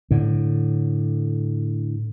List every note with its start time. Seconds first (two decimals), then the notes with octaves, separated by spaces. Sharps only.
0.11 A2 D3